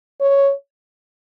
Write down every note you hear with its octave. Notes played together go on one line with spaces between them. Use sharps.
C#5